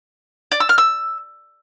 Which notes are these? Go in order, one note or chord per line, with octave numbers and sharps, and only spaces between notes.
D5
E6
F6
E6